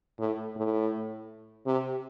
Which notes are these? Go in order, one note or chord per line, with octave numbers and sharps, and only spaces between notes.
A2
A2
C3